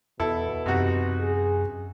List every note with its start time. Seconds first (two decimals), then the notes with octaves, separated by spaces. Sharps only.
0.20 E2 B2 E4 A4
0.66 F#2 C3 D#4 F#4
1.20 G#4